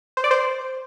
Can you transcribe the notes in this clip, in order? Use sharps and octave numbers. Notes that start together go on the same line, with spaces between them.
C5
D5
C5